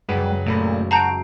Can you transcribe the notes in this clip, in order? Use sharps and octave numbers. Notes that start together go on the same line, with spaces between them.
C#2 F#2 G3 G#4 B4 F#5
G#1 A#2 A3 B5
F#4 A5 A#5 G6 C7 D7